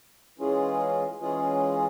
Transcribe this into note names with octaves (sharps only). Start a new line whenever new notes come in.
E3 G#3 C#4 F4 G#4
E3 G#3 C#4 F4 G#4